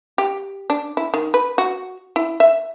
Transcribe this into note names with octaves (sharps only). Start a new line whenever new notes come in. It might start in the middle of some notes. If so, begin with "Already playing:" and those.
G4
D4
E4
D#3
B4
F#4
E4
E5